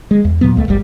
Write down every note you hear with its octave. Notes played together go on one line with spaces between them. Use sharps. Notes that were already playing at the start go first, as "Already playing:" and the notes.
G#3
E2
E2 A#2 F#3 B3
D#1 C#2 A3
D1 G#1 G3